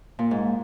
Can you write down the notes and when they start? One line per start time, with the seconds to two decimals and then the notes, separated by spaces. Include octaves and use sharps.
0.19 A#2
0.31 G#2